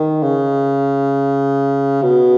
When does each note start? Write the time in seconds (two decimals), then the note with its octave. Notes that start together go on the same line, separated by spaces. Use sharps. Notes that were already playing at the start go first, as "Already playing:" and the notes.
Already playing: D#3
0.23 C#3
2.02 B2